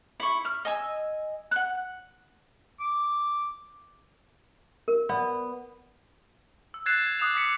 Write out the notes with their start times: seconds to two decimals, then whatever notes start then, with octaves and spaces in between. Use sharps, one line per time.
0.20 E4 C#6
0.45 F6
0.65 D#5 G#5 E6
1.51 F#5 F#6
2.80 D6
4.88 A#4
5.09 B3 D5
6.74 E6
6.86 F#6 G#6 A6 C7 E7
7.02 G6 G#6
7.19 D6 D#6 F#6 C7 E7 F7
7.35 D6 B6 C#7